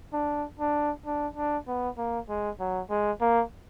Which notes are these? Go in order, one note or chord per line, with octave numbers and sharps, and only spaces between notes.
D4
D4
D4
D4
B3
A#3
G#3
F#3
G#3
A#3